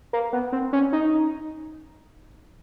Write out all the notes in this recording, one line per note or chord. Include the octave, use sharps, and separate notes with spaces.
A#3
B3
C4
C#4
D#4